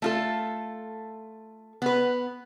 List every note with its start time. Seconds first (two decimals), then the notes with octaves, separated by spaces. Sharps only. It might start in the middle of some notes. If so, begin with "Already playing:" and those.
0.02 A3 F4 A4
1.82 B3 B4